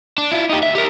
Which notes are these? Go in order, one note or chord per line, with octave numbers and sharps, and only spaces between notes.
D4
E4 F4
D#4 G4
D#2 E5
G4 A#4